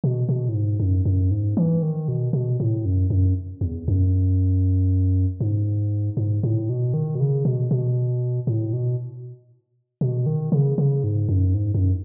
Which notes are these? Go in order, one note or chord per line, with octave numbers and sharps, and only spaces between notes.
B2
B2
A2
G#2
F#2
F#2
G#2
E3
D#3
B2
B2
A2
F#2
F#2
E2
F#2
G#2
G#2
A2
B2
D#3
B2
C#3
B2
B2
A2
B2
B2
D#3
C#3
C#3
G#2
F#2
G#2
F#2